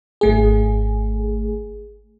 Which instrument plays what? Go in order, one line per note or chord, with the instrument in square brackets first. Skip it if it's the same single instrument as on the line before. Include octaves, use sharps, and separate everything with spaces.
[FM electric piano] G#1 A3 G#4